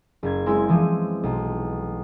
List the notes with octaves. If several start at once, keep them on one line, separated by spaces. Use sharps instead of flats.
F#1 G#6
G#3 C4 E4 G#5
E3 F3 D#7
B1